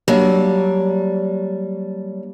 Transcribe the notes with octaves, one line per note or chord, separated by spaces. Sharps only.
F#3 G3 A#3 D4